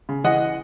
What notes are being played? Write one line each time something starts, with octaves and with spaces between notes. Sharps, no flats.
C#3
E3 D#5 F#5